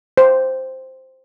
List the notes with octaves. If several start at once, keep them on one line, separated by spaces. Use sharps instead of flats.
C5